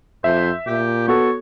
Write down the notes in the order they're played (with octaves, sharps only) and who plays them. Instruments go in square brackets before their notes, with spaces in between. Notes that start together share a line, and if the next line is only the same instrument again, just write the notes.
[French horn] F2 [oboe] C5 [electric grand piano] E5
[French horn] A#2 [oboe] G4
[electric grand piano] B3 F#4 A4 [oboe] C#5